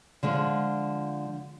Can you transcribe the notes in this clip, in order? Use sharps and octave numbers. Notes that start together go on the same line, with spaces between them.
D3 F3 G#3